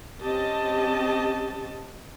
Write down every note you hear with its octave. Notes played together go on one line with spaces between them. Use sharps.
C4 C#4 G4 D#5 A5